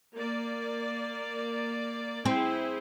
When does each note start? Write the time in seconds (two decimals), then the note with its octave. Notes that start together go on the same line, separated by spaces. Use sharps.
0.14 A#3 D5
2.25 C4 E4 G#4 C5